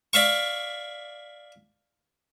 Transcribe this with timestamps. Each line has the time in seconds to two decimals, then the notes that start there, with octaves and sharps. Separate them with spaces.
0.13 D5 E5 F5 C#6